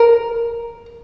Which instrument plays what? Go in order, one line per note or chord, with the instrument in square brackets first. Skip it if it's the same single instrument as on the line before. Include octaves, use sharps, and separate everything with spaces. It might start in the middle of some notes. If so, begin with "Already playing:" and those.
Already playing: [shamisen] A#4